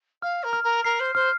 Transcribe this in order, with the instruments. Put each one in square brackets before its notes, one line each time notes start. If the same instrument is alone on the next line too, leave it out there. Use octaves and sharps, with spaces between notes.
[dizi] F5 [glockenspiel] F6
[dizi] A#4
[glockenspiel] F6
[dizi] A#4
[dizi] A#4 [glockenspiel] C7
[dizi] C5
[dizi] C5 [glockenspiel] F6